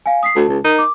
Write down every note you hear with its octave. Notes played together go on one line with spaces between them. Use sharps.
F5 G#5
D#6 B6 C7
D2 A5
C#2
D#4 A#4
D6